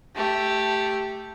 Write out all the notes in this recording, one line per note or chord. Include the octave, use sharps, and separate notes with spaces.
A3 G4